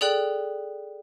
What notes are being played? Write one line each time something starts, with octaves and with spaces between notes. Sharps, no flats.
G#4 A4 D5 G5 F#6 F#7